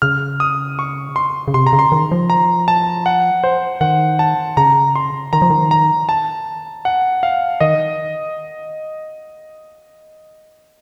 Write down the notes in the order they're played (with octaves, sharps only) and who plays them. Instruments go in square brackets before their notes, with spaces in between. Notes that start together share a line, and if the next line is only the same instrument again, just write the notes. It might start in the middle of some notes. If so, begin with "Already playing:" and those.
[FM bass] C#3 [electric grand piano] F6
[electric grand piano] D#6
C#6
C6
[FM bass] C#3
[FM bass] C3 [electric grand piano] C6
[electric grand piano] A#5
[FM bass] C#3
[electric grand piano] C6
[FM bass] D#3
F3
[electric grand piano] A#5
A5
F#5
C5
[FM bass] D#3 [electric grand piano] F#5
[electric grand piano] A5
[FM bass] C#3 [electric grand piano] A#5
[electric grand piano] C6
[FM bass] D#3 [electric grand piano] A#5
[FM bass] F3
D#3
[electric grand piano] A#5
A5
F#5
F5
[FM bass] D#3 [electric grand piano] D#5